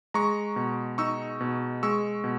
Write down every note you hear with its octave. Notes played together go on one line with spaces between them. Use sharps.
G#3 A#5 C#6
B2
D#4 C#6 E6
B2
G#3 C#6 E6
B2